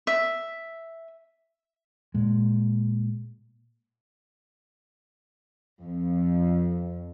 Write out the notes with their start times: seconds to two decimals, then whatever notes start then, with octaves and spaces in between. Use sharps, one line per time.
0.07 E5
2.14 A#2 G#3
5.82 F2